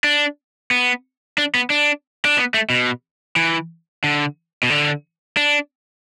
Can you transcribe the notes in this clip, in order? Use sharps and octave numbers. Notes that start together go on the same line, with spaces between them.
D4
B3
D4
B3
D4
D4
B3
A3
B2
E3
D3
B2
D3
D4